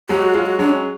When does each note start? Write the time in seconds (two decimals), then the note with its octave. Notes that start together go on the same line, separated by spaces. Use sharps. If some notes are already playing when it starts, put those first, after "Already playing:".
0.09 F#3 G#3 G4
0.22 F#4
0.34 F#3 G#3 F4
0.46 F#4
0.59 F#3 G#3 D4
0.69 C#4